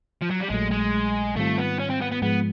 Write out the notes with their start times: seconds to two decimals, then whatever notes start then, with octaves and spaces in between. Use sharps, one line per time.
0.22 F3
0.31 F#3
0.41 G3
0.50 A#1 A#2 F#3 G#3 A3
0.71 G#3
1.36 G#2 D#3 G3 A3 C4 F4
1.58 B3
1.79 C#4
1.90 C4
2.01 B3
2.11 B3
2.22 G#2 F3 G#3 B3